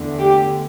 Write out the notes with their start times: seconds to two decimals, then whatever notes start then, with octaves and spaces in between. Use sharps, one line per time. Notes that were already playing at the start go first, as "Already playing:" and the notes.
Already playing: E2 D3 A3
0.18 G4